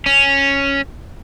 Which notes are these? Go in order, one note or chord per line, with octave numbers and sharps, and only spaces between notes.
C#4